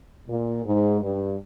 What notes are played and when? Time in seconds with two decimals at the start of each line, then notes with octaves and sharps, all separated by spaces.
0.27 A#2
0.64 G#2
1.01 G2